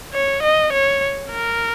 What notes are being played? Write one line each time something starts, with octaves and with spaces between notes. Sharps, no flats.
C#5
D#5
C#5
A#4